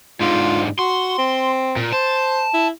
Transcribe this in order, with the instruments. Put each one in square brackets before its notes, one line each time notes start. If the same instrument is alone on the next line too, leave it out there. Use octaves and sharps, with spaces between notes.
[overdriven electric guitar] G#2 D3 [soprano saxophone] F4
[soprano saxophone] F#4 [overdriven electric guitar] C6
[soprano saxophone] C4
[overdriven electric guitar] A#2
[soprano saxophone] C5 [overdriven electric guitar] A5
[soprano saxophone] E4